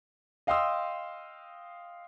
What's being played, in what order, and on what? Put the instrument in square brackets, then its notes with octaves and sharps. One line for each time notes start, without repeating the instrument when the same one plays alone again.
[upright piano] D#5 F5 G5 C6 D#6 E6